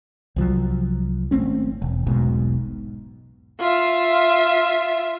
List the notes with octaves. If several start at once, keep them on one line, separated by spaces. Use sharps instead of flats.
C2 F3 F#3
G#1 A3 C4 C#4
E1
E1 B1 G#2 B2
F4 E5